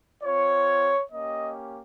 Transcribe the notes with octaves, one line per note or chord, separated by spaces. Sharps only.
C4 F4 C#5
A#3 C#4 G4 D#5